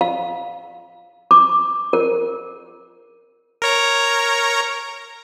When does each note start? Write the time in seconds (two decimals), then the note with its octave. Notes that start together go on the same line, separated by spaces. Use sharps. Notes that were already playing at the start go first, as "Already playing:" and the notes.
0.01 F5
1.31 D6
1.93 A#4
3.62 A#4 C#5 A#5